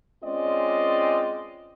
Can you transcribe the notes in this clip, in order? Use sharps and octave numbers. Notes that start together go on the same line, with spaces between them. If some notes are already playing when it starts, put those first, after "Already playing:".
G#3 C4 C#4 F4 D5 D#5